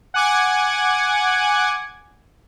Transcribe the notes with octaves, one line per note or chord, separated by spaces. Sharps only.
F#5 G#5 D6 G#6